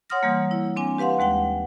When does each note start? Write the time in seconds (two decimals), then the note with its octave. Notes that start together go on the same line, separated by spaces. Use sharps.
0.10 C#5 F#5 C6 D#6 F6 A#6
0.23 E3 G3 A#3
0.51 E4
0.76 C4 D4 G#5
0.98 G4 B4 F5 F#5 C6
1.19 D#2 G#3 F#5 G5